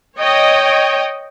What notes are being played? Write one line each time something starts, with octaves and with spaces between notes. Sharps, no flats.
C#5 D#5 G5